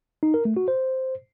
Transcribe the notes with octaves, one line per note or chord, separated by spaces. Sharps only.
D#4
A#4
A3
F#4
C5